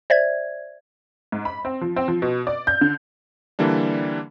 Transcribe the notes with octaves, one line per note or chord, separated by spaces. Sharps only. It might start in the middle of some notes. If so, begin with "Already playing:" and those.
C5 D5 E5 G#6
G#2
B5
C4
F3
C4
F3
B2
D5
G6
D3
D3 E3 G3 A#3 D4